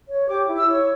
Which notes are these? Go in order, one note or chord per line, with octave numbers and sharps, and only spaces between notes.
C#5
G4 D6
E4
E6
C#5